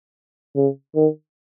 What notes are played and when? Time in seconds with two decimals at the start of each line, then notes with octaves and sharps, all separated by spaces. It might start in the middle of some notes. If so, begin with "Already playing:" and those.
0.56 C#3
0.95 D#3